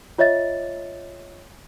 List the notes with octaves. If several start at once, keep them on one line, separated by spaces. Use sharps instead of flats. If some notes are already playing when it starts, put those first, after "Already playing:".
F4 C#5 D#5 E5 A6